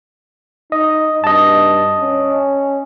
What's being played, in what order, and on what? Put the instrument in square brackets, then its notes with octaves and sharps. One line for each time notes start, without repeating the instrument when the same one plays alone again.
[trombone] D#4 [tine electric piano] D#5
[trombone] G2 [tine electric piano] D#5 A5
[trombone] C#4